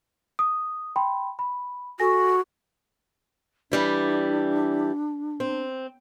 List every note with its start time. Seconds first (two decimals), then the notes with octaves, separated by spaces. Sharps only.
0.39 D#6
0.96 G5 B5 C6
1.39 B5
2.00 F#4 A4 G#5 A#6
3.72 E3 G3 D4 E4
5.40 C4